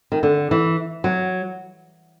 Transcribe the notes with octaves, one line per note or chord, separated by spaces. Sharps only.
D#3
D3
E3
F#3